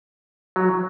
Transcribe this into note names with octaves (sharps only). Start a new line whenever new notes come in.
F#3